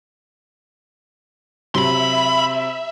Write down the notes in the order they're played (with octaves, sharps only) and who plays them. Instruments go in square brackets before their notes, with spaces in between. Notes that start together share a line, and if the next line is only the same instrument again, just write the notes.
[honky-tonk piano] C3 F#3 [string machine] E5 [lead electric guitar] B5 C6